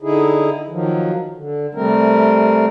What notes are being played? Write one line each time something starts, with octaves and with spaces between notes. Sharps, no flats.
D3 D#4 E4 G#4
D#3 F3 F#3
D3
C3 G3 A3 C4 A#4